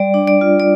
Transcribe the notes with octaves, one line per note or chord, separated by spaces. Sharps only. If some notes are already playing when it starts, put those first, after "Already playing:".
Already playing: G3 D5
D4
D5
F4
D5